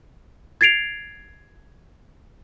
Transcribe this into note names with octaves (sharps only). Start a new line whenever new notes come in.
G#6 A6 C7 D7 F7